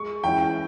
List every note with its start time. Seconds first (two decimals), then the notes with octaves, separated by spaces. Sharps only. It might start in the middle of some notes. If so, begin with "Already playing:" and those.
Already playing: G#3 C#6
0.24 E3 G#3 C#4 E4 G5